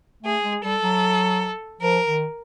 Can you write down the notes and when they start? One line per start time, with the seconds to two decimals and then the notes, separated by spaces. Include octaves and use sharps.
0.23 A3 G#4
0.43 G#3
0.63 G3 A4
0.82 F#3
1.81 F3 A#4
2.06 D#3